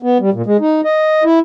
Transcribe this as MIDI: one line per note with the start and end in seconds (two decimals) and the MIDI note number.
0.03 0.18 59
0.20 0.30 55
0.33 0.42 46
0.46 0.57 56
0.60 0.81 63
0.85 1.23 75
1.24 1.39 64